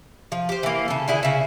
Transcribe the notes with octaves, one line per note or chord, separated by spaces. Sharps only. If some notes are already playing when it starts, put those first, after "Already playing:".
F3
G4 C5
E3 A#3
C#3 A4
D3 E4 G#4
C#3 E5